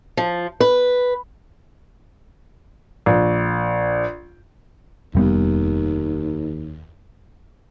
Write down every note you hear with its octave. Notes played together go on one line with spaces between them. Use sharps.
F3
B4
A#1
F1 D#2 G3 B3